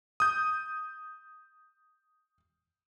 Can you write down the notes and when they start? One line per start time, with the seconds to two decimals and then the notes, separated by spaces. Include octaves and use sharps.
0.20 D#6 G6